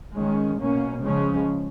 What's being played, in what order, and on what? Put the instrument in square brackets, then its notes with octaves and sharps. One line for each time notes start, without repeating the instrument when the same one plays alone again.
[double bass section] D#3 G#3 C#4
B2 A#3 C#4
C#3 F3 G#3 C#4